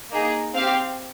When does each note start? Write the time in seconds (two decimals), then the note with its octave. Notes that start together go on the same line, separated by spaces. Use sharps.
0.10 A#3 D#4 G#4
0.54 C4 G4 F5